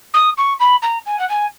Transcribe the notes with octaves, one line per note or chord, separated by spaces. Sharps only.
D#6
C#6
B5
A#5
G#5
F#5
G#5